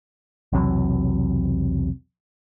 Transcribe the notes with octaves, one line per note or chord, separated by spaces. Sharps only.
B1 E2 C3 F#3